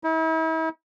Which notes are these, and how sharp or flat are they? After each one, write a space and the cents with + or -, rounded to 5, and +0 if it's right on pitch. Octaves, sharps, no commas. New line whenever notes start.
E4 -40